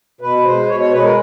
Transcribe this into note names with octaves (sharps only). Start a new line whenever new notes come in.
B2 B4
G#3 C5
B2 C#5
C#5
G#3 B4
A#4